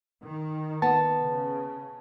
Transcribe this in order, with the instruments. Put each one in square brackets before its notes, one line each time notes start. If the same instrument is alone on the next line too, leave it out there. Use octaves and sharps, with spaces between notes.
[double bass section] D#3
[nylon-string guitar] B3 [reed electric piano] A5
[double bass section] C#3